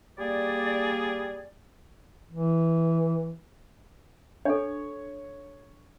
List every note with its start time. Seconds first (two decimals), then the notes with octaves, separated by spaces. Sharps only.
0.18 G3 A#3 G#4 D5
2.31 E3
4.45 D4 A4 C#5